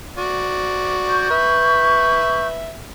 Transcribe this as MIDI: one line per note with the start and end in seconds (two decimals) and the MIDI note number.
0.18 1.29 66
0.18 1.29 74
1.09 2.46 85
1.09 2.46 91
1.31 2.75 71
1.31 2.75 76